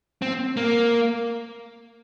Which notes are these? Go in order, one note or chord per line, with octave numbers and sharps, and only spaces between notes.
C4
A#3